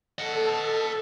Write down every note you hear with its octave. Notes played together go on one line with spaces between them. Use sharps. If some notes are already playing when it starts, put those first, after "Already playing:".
A4 D#5 F#5